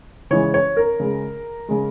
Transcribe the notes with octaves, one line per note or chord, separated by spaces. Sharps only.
C#3 E3 G#3 C#5
C#5
A#4
C#3 G#3
C#3 G#3